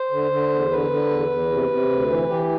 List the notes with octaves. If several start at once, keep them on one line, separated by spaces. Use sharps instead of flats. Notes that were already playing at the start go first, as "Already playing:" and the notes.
Already playing: C5
D3
D3
E2
D3 B4
D3
E2
E2
C3
C3
D2
E3
E3 G4